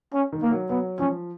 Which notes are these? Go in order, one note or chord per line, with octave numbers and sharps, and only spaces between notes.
C#4
D#3
A#3
F#3
F#3 B3
F3 C#4